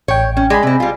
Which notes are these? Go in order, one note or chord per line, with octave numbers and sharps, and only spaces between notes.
A1 C#5 G5
C#4
G#3 D5 G#5 B5
C3 C4
G3 F4